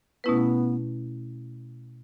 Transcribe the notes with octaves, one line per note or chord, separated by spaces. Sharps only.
B2 A3 B3 C#4 E4 B4